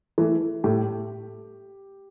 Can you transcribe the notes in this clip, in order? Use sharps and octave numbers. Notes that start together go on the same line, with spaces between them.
E3 A3
A2 G4